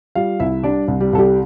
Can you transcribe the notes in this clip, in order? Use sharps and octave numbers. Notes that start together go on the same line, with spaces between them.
G3 F4 F5
C2 E4 E5
G3 D4 D5
C2
G3 G4
C2 A4
G3 G4